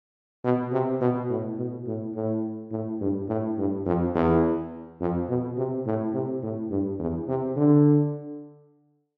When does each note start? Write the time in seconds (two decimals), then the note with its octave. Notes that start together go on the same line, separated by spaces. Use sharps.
0.44 B2
0.72 C3
1.01 B2
1.30 A2
1.58 B2
1.87 A2
2.15 A2
2.72 A2
3.01 G2
3.28 A2
3.58 G2
3.86 F2
4.15 E2
5.01 F2
5.29 B2
5.57 C3
5.86 A2
6.13 C3
6.42 A2
6.71 G2
6.99 E2
7.28 C3
7.56 D3